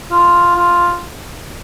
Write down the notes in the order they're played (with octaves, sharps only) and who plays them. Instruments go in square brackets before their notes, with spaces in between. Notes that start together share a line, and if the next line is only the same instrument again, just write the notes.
[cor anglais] F4
F4